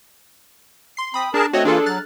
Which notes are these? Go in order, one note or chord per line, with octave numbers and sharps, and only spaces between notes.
C6 C7
C4 B5 D#6 B6
D4 G#4 A#4 A5
A3 C4 F#4 C#5 D#5
E3 A#3 D4 F4 G#4 A4
F#3 F6 F#6 A6